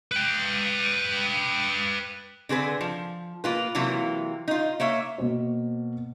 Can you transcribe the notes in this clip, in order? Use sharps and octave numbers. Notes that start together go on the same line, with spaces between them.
B4 G5
D3 C4 G#4 B4
F3
A#3 F4 B4
C3 E3 F#3 A#3 F4
D#4 F4
A#3 C#5 E5
B2 A#3 C5